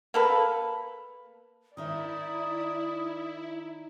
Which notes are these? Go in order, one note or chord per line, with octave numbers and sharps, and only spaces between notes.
A#3 A4 B4
D#3 D#4 E4 D5 E5 D#6